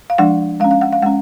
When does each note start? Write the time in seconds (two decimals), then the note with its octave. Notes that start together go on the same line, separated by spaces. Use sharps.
0.10 F5
0.18 F3 G#3 D4 F#5
0.60 G#3 F5
0.64 C#4
0.71 F5
0.81 F#5
0.93 F5
1.02 G#3 C#4 F#5